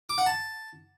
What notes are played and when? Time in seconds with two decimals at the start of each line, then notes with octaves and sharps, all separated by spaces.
0.09 D6
0.18 F#5
0.26 A5